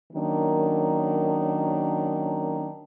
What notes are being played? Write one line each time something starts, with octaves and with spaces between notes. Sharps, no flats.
D#3 F#3 A#3 C#4 D4